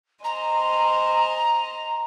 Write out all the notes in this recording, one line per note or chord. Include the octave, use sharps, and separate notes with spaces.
C5 D#5 G#5 A#5